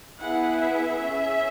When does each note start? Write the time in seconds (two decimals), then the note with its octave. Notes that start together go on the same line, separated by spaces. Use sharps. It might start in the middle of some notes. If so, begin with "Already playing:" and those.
0.21 B3 E4 G#4 F#5
0.59 E5
0.99 C#4 G#4